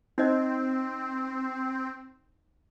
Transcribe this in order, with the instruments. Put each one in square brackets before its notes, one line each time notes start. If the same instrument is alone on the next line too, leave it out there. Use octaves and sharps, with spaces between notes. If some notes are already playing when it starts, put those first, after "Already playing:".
[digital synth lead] C4 [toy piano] D#4 C5 D#5